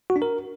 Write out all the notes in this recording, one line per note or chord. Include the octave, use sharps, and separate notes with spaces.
F#4
D4
A#4